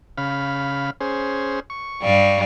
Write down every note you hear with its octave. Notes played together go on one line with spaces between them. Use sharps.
C#3 F5 B5
C#4 G#4 C5
C#6
G2 G3 F5